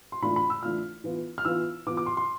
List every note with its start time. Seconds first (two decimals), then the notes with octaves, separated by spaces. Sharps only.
0.12 C6
0.23 E3 A3 D4 F4 B5
0.36 B5
0.50 E6
0.62 E3 A3 D4 F4 F6
1.04 E3 B3 F4
1.38 F6
1.45 E3 B3 F4 E6
1.87 E3 B3 F4 D6
1.97 D6
2.06 C6
2.17 C6